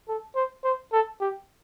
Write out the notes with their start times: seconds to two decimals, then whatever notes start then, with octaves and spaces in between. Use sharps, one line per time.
0.09 A4
0.36 C5
0.64 C5
0.93 A4
1.21 G4